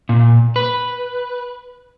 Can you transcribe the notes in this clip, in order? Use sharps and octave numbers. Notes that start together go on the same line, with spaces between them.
A#2
B4